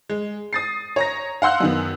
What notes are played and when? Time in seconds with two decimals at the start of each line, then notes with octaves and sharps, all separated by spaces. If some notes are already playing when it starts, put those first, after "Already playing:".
0.09 G#3
0.53 D#6 A6 C7
0.96 C#5 A#5 A#6
1.42 F5 F#5 C6 E6 F#6
1.60 F#2 D#3 B3